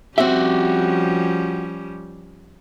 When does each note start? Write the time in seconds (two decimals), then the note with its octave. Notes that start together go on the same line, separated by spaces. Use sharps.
0.18 F3 G3 C4 C#4 F#4 G4 E5